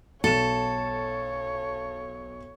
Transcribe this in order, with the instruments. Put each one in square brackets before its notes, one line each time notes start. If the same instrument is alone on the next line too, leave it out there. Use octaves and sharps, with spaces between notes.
[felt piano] B1 E7 [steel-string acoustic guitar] A4 [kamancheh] C#5